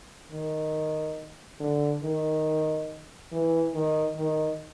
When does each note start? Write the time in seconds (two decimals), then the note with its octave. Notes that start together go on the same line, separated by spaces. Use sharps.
0.32 D#3
1.60 D3
2.03 D#3
3.32 E3
3.74 D#3
4.17 D#3